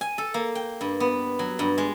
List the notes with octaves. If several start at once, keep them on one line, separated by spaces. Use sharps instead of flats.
G#5
A4
A#3
G5
G2
B3
F#3
G2
G#3